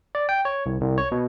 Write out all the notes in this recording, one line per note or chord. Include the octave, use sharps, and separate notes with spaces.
D5
G5
C#5
C2
C2
C#5
B2